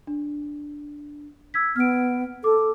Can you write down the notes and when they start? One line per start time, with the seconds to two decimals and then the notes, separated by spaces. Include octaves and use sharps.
0.07 D4
1.54 E6 G#6 B6
1.76 B3 F6 D7
2.44 A4 D6